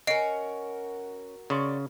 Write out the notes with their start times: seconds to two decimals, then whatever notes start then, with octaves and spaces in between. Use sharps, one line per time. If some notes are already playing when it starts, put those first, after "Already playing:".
0.07 C#4 F#4 A#4 D#5 C7 D7
1.50 C#3 D5 C6 C#6